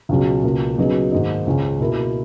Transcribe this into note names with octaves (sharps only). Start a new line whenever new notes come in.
C#2 B2 F#3 C#4 G#4
C#2 B2 A#3
C#3 F#3 B3 D#4 G#4
G#2 D#3 A#3 D#4
C#2 C#3 G#3 C#4 G#4
B2 A#3 E4 A#4